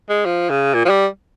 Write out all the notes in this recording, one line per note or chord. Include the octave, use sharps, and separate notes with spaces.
G#3
F3
C#3
A#2
F3
G3